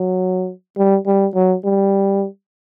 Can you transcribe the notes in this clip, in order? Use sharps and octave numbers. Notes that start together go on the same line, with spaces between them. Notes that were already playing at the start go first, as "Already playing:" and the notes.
Already playing: F#3
G3
G3
F#3
G3